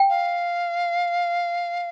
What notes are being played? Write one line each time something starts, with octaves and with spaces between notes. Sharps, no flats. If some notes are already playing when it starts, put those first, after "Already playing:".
Already playing: G5
F5